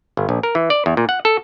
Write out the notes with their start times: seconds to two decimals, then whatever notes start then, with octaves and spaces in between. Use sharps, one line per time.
0.17 G1
0.29 A#1
0.43 A#4
0.55 E3
0.70 D5
0.86 E2
0.97 A#2
1.09 F#5
1.25 A4